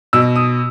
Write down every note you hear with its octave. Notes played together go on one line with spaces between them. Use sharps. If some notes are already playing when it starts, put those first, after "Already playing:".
B2 E6
D#6